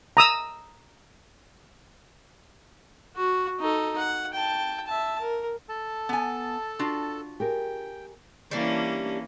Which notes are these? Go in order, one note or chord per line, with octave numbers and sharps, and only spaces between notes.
A#5 D#6 E6
F#4
D#4 A4
F#5
G5 A5
E5 A5
A#4
A4 A5
B3 G#5
D4 F4 F#4
G4 G#4 A#4 G5
E3 G3 A#3 C#4 D4